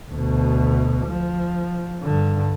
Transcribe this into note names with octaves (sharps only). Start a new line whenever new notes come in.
D2 B2
F3
G2 D3